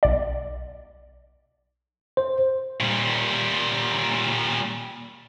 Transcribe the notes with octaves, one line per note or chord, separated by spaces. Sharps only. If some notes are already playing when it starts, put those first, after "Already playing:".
B1 D5
C5
A#2 G3